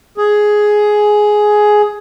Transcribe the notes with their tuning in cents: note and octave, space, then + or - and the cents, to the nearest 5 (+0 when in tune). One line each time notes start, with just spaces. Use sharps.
G#4 +10